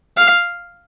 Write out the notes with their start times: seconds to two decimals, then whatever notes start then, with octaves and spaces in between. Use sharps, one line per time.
0.17 F5